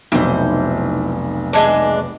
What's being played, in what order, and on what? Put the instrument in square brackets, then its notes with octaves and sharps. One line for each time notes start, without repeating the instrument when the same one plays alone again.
[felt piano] F1 B1 [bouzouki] E3 C5
[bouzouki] E3 G#3 D4